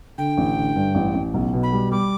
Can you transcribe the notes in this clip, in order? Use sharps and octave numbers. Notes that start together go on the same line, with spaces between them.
D3 G5
A1
D3
G2
A1
A1
B1
B2
B5
G3
G3 D6